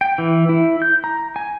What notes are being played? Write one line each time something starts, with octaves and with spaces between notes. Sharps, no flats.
G5
E3
E4
G6
A#5
G#5